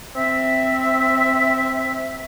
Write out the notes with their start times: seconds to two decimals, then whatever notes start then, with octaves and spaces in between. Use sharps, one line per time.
0.15 C4 E5